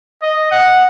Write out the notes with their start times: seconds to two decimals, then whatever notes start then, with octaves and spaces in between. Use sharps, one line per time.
0.22 D#5
0.52 F#5